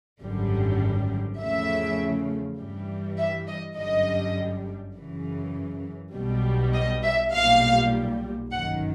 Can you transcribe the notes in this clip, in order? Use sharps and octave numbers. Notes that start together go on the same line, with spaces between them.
G#1 F#2 D3 G3
E2 C#3 F3 A3 E5
G2 E3 G3
E5
D#5
G1 F#2 D3 G3 D#5
F#2 C#3 E3
B1 B2 G3
D#5
E5
B1 A#2 G3 F5
G1 F#2 D#3 F#5